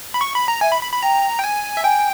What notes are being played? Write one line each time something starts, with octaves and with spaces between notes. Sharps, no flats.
B5
C#6
B5
A#5
E5 G#5
B5
B5
B5
G5 A#5
G5
G#5
E5
G5 G#5